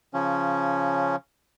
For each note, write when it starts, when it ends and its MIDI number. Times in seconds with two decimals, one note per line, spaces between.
0.14 1.16 49
0.14 1.16 53
0.14 1.16 61